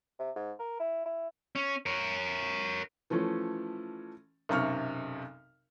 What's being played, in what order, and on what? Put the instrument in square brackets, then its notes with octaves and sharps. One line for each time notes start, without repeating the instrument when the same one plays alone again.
[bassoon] C3
G#2
A#4
E4
E4
[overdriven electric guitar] C#4
A#4 C#5
[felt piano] E3 F3 A3 C#4
B1 F#2 C3 C#6 F6